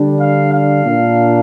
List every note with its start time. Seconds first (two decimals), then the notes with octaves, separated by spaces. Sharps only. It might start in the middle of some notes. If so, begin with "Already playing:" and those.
Already playing: D3 G3 D4
0.19 F5
0.52 F5
0.85 A#2 A#3 D4